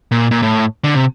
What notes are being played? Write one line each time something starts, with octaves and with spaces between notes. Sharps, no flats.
A#2
A#2
A2
D3
C3